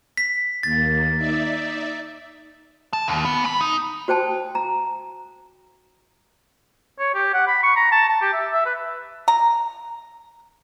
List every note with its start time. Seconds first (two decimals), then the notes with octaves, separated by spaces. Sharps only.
0.17 B6
0.63 D#2 A#3 A6
1.18 D#4 D5 E5
2.93 A5
3.08 D#2
3.25 B3
3.44 G#3 B5
3.61 D#4
4.08 F#4 C5 G5 A5
4.55 A#5
6.99 C#5
7.14 G4
7.34 F#5
7.47 B5
7.63 C#6
7.76 A#5
7.92 A5
8.09 A5
8.21 G4
8.33 E5
8.52 E5
8.65 B4
9.28 A#5